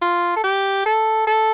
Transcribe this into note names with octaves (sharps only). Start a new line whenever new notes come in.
F4
A4
G4
A4
A4